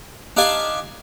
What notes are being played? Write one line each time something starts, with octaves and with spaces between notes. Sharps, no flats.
D4 D#4 G4 F5 G#5 A5